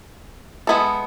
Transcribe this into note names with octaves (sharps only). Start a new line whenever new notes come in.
G#3 B3 E4 A4